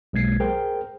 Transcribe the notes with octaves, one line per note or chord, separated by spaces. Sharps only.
B1 G#3 A#3 G#6 C7
G#4 A#4 C5 G5